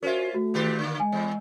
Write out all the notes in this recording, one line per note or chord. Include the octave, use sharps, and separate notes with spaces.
C#4 F4 F#4 A#4 C5 E5
A3 F#4
A#2 D#3 G4
D3 A#3
G#3 G#5
E2